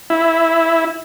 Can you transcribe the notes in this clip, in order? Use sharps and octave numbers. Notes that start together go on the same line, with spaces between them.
E4